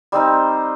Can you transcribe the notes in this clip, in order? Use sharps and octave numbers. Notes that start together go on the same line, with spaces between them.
G3 C4 D#4 C5